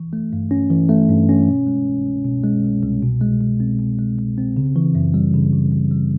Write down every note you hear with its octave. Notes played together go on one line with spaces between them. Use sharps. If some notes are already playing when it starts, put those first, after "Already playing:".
Already playing: E3
A3
G2
C#4
E3
A3
G2
C#4
B2
G#3
C2
C2
B2
G#3
C2
C2
B2
G#3
C2
C4
B2
G#3
C2
C4
C#3
E3
F#2
G3
C#3
E3
F#2
G3